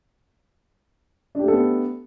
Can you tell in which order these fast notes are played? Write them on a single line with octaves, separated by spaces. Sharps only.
D4 G4 A3 A4 B3